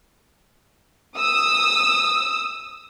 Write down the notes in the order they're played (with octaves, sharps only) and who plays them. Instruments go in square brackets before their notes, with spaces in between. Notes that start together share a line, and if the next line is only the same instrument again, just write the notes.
[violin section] D#6 E6